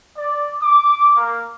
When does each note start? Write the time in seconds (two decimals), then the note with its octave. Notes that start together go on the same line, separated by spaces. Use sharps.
0.16 D5
0.61 D6
1.17 A#3